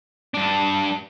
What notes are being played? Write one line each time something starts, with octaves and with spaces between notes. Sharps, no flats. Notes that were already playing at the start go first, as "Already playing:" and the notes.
G2 D4